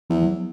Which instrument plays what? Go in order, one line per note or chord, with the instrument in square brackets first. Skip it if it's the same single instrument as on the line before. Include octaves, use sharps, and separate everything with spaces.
[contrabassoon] E2 [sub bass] F3
[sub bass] F#3